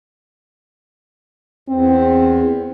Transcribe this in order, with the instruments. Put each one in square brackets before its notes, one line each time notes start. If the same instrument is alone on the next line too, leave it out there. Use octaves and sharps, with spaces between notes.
[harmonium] E2 [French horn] C4